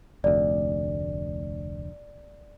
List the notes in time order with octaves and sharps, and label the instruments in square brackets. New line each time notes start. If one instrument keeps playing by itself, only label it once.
[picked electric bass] F1 D2 [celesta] D5